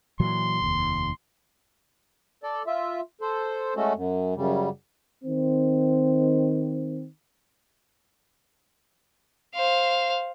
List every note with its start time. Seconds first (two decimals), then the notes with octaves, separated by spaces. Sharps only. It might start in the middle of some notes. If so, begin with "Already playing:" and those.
0.20 A#2 E3 F#3 C6
0.62 F1 D#2
2.43 A4 D5
2.67 F4 E5
3.21 A4 C5
3.76 G#3 A3 C#4 F#4 A4
3.95 F#2
4.36 F#2 C#3 G3
5.24 D#3 C4
9.55 C5 F5